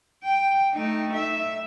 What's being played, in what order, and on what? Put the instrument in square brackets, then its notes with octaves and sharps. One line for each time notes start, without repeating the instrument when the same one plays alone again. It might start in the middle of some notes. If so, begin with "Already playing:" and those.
[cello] G5
A3 D#4
E5